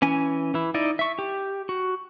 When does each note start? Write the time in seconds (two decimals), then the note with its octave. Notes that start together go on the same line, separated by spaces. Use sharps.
0.02 E3 C#4 G#5
0.54 E3 E4
0.74 D#4 E4 D5 D#5
0.99 E5 C#6
1.19 G4
1.69 F#4